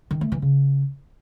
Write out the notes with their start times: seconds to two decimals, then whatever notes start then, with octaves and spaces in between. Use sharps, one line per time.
0.11 D#3
0.21 A3
0.32 E3
0.42 C#3